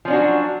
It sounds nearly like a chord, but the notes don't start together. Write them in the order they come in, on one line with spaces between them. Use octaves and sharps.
F3 C#4 D4 F#4 F#3